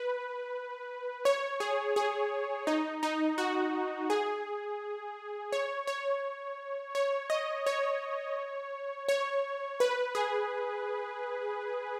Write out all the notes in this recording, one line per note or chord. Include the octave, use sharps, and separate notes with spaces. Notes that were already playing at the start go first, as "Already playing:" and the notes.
Already playing: B4
C#5
G#4
G#4
D#4
D#4
F#4
G#4
C#5
C#5
C#5
D#5
C#5
C#5
B4
G#4